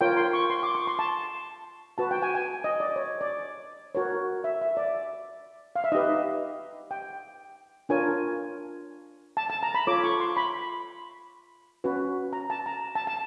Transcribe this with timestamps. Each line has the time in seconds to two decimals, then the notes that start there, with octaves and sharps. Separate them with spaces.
0.01 F4 A#4 C#5 G5
0.17 C6
0.33 C#6
0.50 C6
0.63 D6
0.75 C#6
0.87 C6
0.99 A5
1.98 F#4 B4 A5
2.11 G5
2.22 G#5
2.35 G#5
2.64 D#5
2.80 D5
2.96 C#5
3.21 D5
3.95 F#4 A#4 C#5
4.44 E5
4.61 E5
4.77 D5
5.76 F5
5.84 E5
5.92 D#4 G4 B4 D#5
6.91 G5
7.89 D4 F4 A#4 C#5 G#5
9.37 A5
9.50 A5
9.63 A#5
9.75 B5
9.87 F4 A4 C#5 D6
10.04 C#6
10.20 C6
10.37 B5
11.84 C#4 F#4 B4
12.33 A#5
12.50 A5
12.66 A#5
12.95 A5
13.07 A5